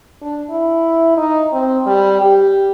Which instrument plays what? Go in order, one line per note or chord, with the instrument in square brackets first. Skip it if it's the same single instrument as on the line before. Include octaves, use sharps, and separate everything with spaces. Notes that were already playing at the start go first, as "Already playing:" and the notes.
[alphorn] D4
E4
D#4
C4
G3
G4